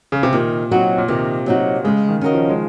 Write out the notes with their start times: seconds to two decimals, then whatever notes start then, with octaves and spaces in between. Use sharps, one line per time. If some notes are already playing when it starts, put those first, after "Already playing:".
0.12 C#3
0.23 C3
0.33 A#2 D#3
0.71 F#3 C4 D#4 F#4
0.98 A#2
1.08 C3 D#3
1.46 F#3 C4 D#4 F#4
1.84 C#3 G#3
2.09 D#3
2.21 C#4 F#4 A#4 D#5
2.34 F3
2.49 G#3